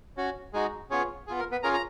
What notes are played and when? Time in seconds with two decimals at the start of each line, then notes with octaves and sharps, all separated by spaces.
0.17 C#4 F#4
0.53 G#3 D#4 F#4 G#4
0.90 B3 C#4 F4 G#4 C#5
1.27 G#4
1.30 B3 F4
1.39 A#4
1.51 B3 B4
1.63 C#4 F4 G#4 A#4 A#5
1.73 A#5